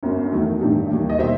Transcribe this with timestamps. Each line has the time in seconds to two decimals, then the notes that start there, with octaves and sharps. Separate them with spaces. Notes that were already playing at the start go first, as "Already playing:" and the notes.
0.03 G1 F#2 F#3
0.32 E2 D#3 F#3 A3
0.61 A1 G2 D#3 G3
0.90 D#2 D#3 G3
1.09 D#5
1.19 B2 G3 C5 E5